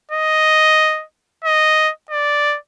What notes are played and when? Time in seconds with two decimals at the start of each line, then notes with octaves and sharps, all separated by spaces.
0.12 D#5
1.45 D#5
2.10 D5